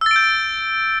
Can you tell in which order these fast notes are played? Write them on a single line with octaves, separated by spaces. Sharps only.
E6 A6 D7 G6